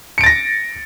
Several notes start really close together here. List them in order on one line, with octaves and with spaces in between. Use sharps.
C#7 D7 A6 A#6